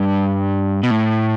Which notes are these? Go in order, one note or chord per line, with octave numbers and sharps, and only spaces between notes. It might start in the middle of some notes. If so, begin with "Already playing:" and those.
Already playing: G2
B2
A2